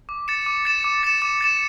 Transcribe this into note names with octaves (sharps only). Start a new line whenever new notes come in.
D6
A6 C#7 E7
D6
A6 C#7 E7
D6
A6 C#7 E7
D6
A6 C#7 E7